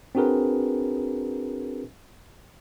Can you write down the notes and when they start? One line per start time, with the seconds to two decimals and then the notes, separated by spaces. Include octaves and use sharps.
0.15 C4 D4 F#4 G#4 A#4 B4